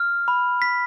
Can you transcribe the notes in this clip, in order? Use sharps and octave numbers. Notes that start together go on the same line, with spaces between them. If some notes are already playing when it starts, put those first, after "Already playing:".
Already playing: F6
B5
B6